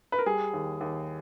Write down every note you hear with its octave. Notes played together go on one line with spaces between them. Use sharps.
B4
A#4
G3 G#4
D#2
D#2